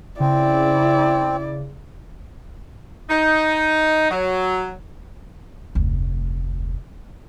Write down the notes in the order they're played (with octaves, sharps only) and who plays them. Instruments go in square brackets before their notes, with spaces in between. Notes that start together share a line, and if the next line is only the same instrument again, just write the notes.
[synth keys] C#3 [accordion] C4 [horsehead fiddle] E4 D5
[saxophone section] D#4
F#3
[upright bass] F1 D2